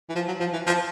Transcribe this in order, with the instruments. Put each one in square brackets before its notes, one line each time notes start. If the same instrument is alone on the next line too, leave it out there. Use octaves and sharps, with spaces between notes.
[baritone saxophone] E3
F3
F#3
F3
E3
F3